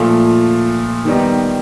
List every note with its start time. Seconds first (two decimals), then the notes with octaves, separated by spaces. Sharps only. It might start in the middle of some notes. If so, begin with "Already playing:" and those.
Already playing: A#2 F3 A3
1.05 D#3 G3 B3 D#4